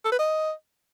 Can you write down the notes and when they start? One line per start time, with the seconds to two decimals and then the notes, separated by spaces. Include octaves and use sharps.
0.05 A4
0.12 B4
0.19 D#5